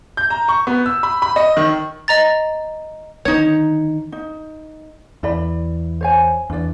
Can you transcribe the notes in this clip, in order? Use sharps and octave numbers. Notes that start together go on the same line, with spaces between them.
G6
A#5
C#6
B3
E6
B5
B5
D#5
D#3
D#5 A#5 A6
D3 D#3 D#4 C#5
D#4
E2 E4 D5 B5
C5 C#5 G#5
E2 D4 D5